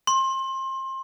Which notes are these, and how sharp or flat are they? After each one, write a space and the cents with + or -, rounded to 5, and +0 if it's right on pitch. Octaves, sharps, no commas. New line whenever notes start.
C6 +25